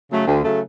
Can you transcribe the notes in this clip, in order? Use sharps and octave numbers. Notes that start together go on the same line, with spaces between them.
C#3 F#3 A3
D2
C#3 F#3 A3